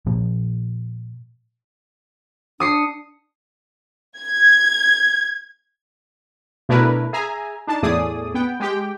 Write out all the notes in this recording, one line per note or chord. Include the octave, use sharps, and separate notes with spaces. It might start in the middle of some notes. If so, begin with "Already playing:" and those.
A#2 F3 A#3
D4 D#6 C7 C#7
G#6
B2 A3 D4 E4 A#4 B4
G#4 E5 G#5 A#5
D4 D#4 A5
E2 A2 A3 G#4 D5 D#6
B3 G5
G#3 G4 G5